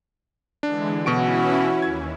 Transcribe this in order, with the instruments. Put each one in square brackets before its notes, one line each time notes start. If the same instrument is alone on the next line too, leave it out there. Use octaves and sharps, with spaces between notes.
[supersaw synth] D3 E3 G#3 [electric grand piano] D4
[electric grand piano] B2 C#6 D7 [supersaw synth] E3 C#4 E4 [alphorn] F#4
[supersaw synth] D#2 [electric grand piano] G#6